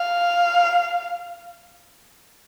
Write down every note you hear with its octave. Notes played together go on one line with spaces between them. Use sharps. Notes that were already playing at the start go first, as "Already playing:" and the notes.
Already playing: F5